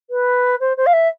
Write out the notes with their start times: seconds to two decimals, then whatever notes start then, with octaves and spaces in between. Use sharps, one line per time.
0.10 B4
0.60 C5
0.77 C5
0.86 F5
0.93 E5